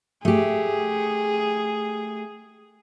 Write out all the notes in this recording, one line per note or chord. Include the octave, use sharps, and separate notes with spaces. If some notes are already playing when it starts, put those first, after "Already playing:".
A3 G4 G#4